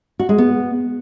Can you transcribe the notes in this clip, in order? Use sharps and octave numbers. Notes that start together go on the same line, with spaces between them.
F#4
G#3
B3